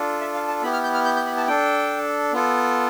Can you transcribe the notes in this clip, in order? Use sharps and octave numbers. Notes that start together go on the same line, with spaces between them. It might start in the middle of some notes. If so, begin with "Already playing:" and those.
Already playing: D4 F4 A4
E5
F5
A5
B3 E4 G4 B5
F6
G6
F6
G6
G6
B5
A5
D4 A4 G5
B3 F4 A4